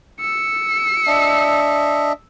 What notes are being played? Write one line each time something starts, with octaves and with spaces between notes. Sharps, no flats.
E6 C#7
D4 D#5 E5